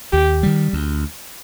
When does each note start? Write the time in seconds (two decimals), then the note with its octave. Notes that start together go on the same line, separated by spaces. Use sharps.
0.13 D#2 G4
0.43 D#3 G3
0.73 D2